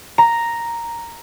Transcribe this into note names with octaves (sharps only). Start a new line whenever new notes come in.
A#5